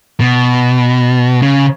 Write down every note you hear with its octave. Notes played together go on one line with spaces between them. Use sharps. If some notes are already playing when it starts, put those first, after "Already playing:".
B2
C#3